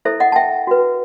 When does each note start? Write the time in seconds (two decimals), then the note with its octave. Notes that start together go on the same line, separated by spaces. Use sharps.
0.05 E4 A4 C5 E5
0.20 D#5 F#5
0.32 A5
0.36 E5 G5
0.67 F#4 B4